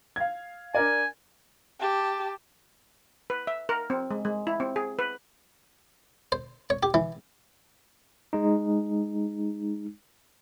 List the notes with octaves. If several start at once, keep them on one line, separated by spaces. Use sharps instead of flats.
F5 G#6
D4 A#4 D5 G#5
G4 A5
B4
E5
A#4
C4
G#3
G#3
E4
C4
G#4
B4
C5
C#5
G4
E3
G#3 D#4